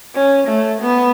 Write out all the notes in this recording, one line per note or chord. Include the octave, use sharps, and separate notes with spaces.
C#4
A3
B3